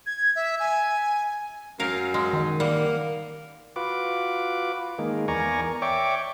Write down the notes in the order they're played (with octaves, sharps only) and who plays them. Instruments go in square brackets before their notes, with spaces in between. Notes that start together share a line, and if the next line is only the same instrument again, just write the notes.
[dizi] G#6
E5
G#5
[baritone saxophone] F#2 [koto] A#4 F5
[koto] G#3
[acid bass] D#3
[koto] G3 F#5 [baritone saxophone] A#3
[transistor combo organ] F4 F#4 B4 D6
D#3 G#3 A#3
E2 A#4 D5 G#5 A#5 C#6
C#5 D5 E5 G5 C#6 D6